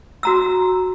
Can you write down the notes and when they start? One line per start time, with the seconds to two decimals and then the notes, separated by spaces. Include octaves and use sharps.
0.23 F#4 A#5 E6